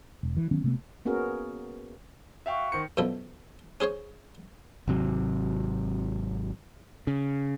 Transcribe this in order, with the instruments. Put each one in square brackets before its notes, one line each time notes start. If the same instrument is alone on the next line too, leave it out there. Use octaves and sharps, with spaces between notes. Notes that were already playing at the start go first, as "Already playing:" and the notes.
[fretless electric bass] E1
E3
D#3 F#3 B3 C#4
C3 A3 B3
[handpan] A#3 B3 C#4 F#4 G#4 A#4
[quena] F#4 [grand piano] E5 F5 G5
[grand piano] D#3 C5 C#7
[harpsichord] F#2 B2 F3 A4
C#4 G#4 C5 C#5
[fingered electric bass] G#1 C3 F#3
C#3